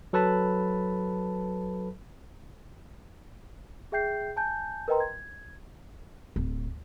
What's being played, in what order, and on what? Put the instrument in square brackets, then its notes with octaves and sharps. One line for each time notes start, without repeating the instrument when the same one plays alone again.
[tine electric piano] F#3 A4 B4 A5 B5
[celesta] G#4 E5 G5 G6 C7
G#5 A5 G6
A#4 B4 D#5 G5 A#5 C6
G#6
[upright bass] D1